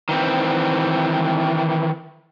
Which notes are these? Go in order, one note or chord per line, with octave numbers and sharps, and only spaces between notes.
D#3 E3 C4